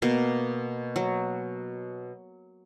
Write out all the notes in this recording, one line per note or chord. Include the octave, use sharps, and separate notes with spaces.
B2 A#3
F#3